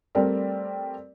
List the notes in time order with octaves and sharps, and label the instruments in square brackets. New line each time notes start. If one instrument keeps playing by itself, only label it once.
[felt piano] G3 A3 C4 A#4 D5